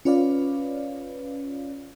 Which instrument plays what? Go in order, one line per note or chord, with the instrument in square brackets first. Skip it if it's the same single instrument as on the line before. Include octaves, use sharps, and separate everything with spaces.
[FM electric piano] C#4 F4 B4 C#5 D5 F5